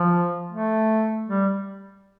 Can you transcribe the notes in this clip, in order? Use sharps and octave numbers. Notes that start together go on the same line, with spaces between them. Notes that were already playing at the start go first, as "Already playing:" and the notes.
Already playing: F3
A3
G3